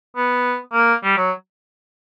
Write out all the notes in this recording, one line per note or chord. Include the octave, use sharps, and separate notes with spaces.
B3
A#3
G3
F#3